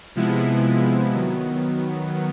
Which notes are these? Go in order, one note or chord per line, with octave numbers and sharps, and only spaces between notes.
C3 F3 G#3 B3 E4
D#3 F#3 B3